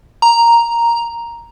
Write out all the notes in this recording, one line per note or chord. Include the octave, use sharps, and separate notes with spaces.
A#5